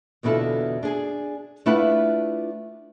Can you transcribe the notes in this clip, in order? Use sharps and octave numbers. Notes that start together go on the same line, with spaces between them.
E2 B2 D3 E4 F4 A4
D4 G#4 G#5
A3 D4 E4 F4 B4 F#5